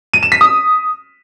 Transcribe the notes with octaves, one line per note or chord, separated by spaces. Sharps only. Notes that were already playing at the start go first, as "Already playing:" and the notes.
D#7
E7
B6
D#6